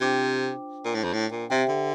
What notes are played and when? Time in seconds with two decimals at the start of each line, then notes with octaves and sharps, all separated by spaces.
0.01 C3 D4 F4 C5 G5 D6
0.85 A#2
0.95 A2
1.04 F2
1.13 A2
1.32 A#2
1.50 C3 G4 C5 E5 G5
1.69 D3